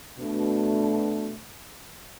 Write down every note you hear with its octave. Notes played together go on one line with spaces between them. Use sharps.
B2 A3 D4